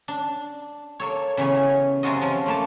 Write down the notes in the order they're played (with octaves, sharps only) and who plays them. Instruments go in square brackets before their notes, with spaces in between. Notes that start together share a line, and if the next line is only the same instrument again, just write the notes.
[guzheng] D4
A#3 A4 C#5
C#3 E3 B3 C#5
F#2 C3 G#3 F4 F#4 D#5
F3 C#4
A3 A#3 A5